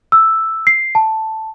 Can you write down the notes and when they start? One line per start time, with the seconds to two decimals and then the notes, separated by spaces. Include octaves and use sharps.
0.12 E6
0.67 C7
0.95 A5